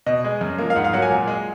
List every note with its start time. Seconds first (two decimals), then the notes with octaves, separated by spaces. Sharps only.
0.06 B2 D#5
0.24 G#3
0.41 F#2
0.58 F3 A#3
0.70 F5
0.76 G#2 F#5
0.84 F5
0.93 F#3 A#3 F#5
1.02 G#5
1.10 A#2
1.27 G#3